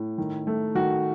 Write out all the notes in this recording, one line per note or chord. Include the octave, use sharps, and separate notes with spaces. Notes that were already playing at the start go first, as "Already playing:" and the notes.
Already playing: A2
D#3
A3
D#3 F#4